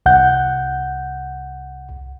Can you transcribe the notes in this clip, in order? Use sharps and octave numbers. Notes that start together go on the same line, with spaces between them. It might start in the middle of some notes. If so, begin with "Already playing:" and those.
C2 F#5 G6